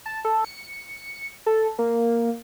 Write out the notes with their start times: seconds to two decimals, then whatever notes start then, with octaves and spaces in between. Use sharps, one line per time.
0.06 A5
0.25 A4
0.44 C#7
1.46 A4
1.79 A#3